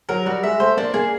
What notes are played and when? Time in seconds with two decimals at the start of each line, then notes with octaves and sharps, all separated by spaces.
0.09 F#3 A#4
0.26 G3 F#4
0.43 G#3 E5
0.60 A3 C5
0.77 A#3 D4
0.94 A#3 G#4